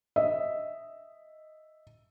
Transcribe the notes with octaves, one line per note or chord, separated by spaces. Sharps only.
D#5 E5